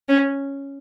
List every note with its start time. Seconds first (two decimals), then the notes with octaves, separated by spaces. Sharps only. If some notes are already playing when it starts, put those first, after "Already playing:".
0.08 C#4